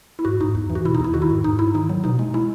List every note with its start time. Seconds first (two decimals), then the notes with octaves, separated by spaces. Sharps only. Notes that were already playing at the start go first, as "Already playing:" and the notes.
0.19 E4
0.25 G#2 F#4
0.40 G#2 D#4
0.55 E2
0.70 E3
0.75 F#4
0.85 B2 E4
0.95 D#4
1.00 E2 E4
1.14 D#3 F#4
1.22 E4
1.30 G#2
1.44 G#2 D#4
1.59 G#2 E4
1.74 D#3 D#4
1.89 F#3
2.04 B2 D#4
2.19 G#3
2.34 G#3 E4